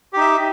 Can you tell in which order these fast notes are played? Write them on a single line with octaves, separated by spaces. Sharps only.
G4 D#4 E5